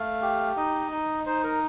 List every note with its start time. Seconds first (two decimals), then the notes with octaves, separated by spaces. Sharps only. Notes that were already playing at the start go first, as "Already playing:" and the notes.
Already playing: A3 F5
0.22 G4
0.57 D#4 D#5
0.92 D#4
1.26 D#4 C5
1.44 A#4